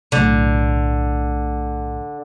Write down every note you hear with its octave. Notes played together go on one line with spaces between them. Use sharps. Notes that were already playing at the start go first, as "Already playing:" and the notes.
B1 A2 D3